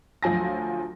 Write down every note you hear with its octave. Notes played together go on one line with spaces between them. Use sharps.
D2 F3 F#3 G#5 A#6